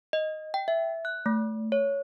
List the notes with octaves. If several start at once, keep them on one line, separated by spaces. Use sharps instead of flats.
D#5
G5
E5
F#6
A3
C#5